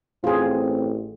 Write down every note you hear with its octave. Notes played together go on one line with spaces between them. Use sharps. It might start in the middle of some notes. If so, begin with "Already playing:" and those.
A1 C4 F4 G#4